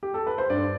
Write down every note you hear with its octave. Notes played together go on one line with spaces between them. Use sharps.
G4
A4
B4
C5
G2 D5